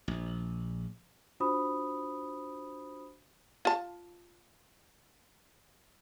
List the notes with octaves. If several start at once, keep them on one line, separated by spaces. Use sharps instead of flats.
A#1
D4 F4 F#4 C5 B5 D#6
F4 A5